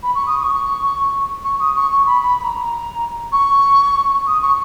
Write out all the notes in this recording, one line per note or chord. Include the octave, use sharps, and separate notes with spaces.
B5
C#6
D#6
D#6
C#6
C#6
D#6
C#6
C#6
B5
B5
B5
A#5
C#6
D#6
C#6